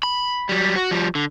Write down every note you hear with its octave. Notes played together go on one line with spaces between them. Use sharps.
B5
F#3 G3
F#4
F3 G3
D3